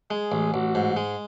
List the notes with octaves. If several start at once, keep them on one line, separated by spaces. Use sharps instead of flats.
G#3 G#4
A1
A1 F#4
G#2
G#3